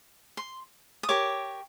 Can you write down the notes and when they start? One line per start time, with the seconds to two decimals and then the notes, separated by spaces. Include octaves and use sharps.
0.37 C6
1.03 D#6
1.09 G4 A#4 C#5 D6